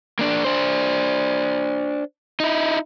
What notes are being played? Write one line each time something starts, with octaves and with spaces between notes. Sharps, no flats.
A#3 D4
D4 C5
D#4 E4